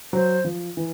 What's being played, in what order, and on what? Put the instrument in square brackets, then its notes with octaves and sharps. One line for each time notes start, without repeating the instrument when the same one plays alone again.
[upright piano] F#3 [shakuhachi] C5
[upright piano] F3
E3